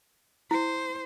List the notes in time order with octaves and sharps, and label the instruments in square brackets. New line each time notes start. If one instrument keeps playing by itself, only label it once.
[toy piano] E4 [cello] C5